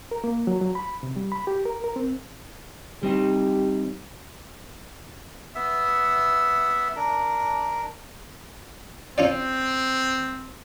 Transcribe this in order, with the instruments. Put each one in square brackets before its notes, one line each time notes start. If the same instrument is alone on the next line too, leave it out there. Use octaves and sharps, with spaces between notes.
[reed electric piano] A#4
A#3
F#3
F#3
B5
C3
G3
B5
G4
A#4
A#4
C4
[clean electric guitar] G3 C4 D#4 [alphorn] G4
[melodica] B3 E5
D4 A#4
[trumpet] C4 [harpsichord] C#4 F4 D5